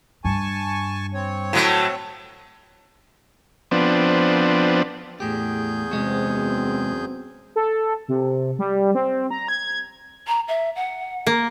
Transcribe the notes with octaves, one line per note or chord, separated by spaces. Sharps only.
G2 G#5 A5 C#6
C4 C#5
A2 F#3 A3
F3 B3 C4 D4
E2 A2 G4 G#4 G6
F#2 C3 G#3 B3 C4 F#4
A4
C3
G3
C4
A#5
G#6
A#5
E5
F#5
A#3